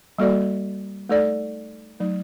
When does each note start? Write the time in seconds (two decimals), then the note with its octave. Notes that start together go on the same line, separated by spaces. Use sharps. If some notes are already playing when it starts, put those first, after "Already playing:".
0.19 G3 A#3 F#4 A4 D5
1.09 A3 D#4 A4 D5
2.00 F#3 A3 D#4